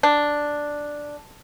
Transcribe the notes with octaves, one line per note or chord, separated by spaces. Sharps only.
D4